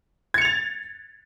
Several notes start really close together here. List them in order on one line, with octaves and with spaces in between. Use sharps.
G#6 C#7 F7 A6